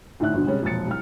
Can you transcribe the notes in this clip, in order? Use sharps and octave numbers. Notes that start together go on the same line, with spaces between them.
D2 A2 D#3 D4 E5 F#6
G1 D2 B2 D3
C3 G3 G#3 C#4
E1 A#2 F3 A6 C#7
C2 F6